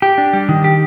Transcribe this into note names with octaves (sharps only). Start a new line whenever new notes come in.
G4
D4
G3
D#3
G4